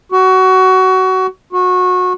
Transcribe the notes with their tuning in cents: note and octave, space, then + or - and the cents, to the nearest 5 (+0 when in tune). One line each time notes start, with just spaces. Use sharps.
F#4 +20
F#4 -25